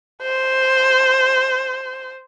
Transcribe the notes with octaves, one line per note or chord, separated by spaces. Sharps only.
C5